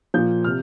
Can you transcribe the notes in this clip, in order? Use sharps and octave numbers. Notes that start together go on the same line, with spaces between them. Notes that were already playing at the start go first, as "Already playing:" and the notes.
A#2 F3 G6
C3 F6